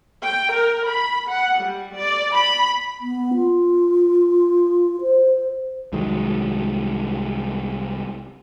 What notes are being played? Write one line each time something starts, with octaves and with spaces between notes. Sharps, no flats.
G5
A#4
B5
F#5
G3
D5
B5
B3
F4
C5
C2 D#3 F#3 G#3